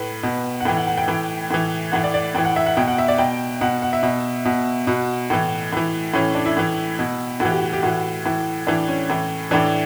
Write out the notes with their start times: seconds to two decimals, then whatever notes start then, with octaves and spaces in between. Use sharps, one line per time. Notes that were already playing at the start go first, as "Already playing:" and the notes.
Already playing: A2 B4
0.23 B2
0.60 F#5
0.65 A2 E3 G5
0.77 F#5
0.87 F#5
0.98 G5
1.08 A2 E3
1.51 A2 E3
1.92 A2 E3 F#5
2.04 D5
2.14 D5
2.35 A2 E3 G5
2.45 F#5
2.56 E5
2.66 F#5
2.77 B2 G5
2.88 F#5
2.98 E5
3.08 D5
3.18 B2 G5
3.61 B2 F#5
3.82 F#5
3.93 E5
4.03 B2
4.45 B2
4.87 B2 F#4
5.30 A2 E3
5.73 A2 E3
6.14 A2 E3 C#4
6.35 D4
6.46 E4
6.57 A2 E3
6.99 B2
7.40 A2 E3 F#4
7.51 G4
7.62 F#4
7.73 G4
7.83 A2 E3 F#4
8.25 A2 E3
8.67 A2 E3 D4
8.88 C#4
9.10 A2 E3
9.51 A2 E3 D4